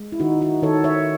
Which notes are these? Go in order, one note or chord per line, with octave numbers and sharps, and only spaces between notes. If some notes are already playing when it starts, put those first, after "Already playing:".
Already playing: G#3
E4
D#3 D#4 F#4
D#4 F#4
D#3 A4 C#5
C#5 E5